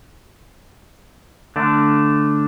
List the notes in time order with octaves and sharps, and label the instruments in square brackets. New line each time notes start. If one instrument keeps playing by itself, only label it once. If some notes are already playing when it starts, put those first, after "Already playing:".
[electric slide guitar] D3 A3 D4